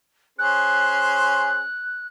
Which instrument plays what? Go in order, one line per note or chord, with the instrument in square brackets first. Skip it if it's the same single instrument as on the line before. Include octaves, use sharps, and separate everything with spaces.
[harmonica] C#4 G#4 C5 [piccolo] F#6